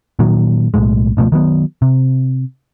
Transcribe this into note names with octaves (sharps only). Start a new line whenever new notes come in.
A#2 D#3 F#3
B1 F#2 A2 G#3
C#2 B2 F3 A3
D#3 F#3 B3
C3